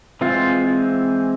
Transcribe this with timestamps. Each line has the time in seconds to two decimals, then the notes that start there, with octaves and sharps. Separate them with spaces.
0.21 E3 G#3 C4 F4